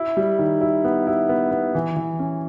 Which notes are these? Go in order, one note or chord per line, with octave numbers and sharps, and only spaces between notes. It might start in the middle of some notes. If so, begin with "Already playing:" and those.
Already playing: E4
G3
D#3
E4
B3
E4
B3
B3
E3
E3
C#4